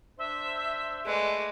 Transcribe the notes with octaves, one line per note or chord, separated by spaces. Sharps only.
D4 C5 E5
G#3 A3 B4 D5